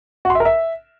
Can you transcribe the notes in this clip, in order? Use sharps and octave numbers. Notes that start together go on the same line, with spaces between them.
F#4
C6
E5
A#4
E5